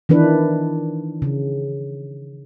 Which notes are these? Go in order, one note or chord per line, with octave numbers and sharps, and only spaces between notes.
D#3 E3 D4 B4
C#3